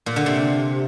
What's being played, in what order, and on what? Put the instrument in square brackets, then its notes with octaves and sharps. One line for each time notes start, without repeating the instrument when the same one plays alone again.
[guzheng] A#2
D3
C3